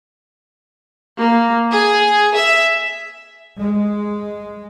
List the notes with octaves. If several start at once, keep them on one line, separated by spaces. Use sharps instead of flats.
A#3
G#4
E5
G#3